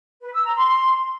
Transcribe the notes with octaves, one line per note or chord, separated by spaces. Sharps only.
B4
E6
A#5
C6